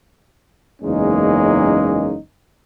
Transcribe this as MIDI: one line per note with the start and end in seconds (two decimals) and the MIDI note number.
0.82 2.16 30
0.82 2.16 40
0.82 2.16 56
0.82 2.16 58
0.82 2.16 61
0.82 2.16 63